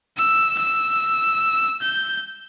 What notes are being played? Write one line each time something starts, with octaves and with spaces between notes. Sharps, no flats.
E6
E6
G6